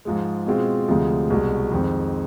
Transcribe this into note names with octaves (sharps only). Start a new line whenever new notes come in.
G#2 F3 G#3
B2 G#3 C4 F4
D2 C3 F3 G#3
C2 B2 G#3
F2 D#3 G#3 C4